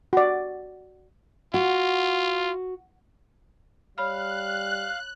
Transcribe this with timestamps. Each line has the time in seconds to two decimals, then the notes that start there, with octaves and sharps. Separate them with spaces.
0.13 F#4 D5
1.54 F4 F#4
3.98 G3 C#5 F5 B5 F6 F#6